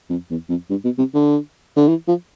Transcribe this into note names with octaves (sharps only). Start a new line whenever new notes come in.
F2
E2
F2
G2
B2
C3
D3
D3
E3
F3